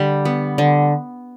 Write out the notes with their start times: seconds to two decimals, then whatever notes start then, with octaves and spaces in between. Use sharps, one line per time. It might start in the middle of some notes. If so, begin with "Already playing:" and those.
Already playing: D3 G3
0.25 B3
0.58 D3